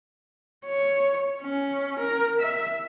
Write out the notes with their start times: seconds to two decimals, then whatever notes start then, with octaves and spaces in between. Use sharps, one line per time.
0.66 C#5
1.42 C#4
2.00 A#4
2.40 E5